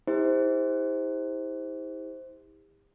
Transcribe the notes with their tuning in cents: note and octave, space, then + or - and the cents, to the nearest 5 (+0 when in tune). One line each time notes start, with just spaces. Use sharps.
E4 -45 G4 +40 C5 +0